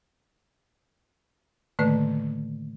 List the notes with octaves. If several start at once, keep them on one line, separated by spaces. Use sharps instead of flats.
A2 D3 D#3 A3 A#3 B4